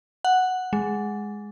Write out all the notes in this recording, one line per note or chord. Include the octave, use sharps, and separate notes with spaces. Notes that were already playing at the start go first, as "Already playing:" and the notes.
F#5
G#3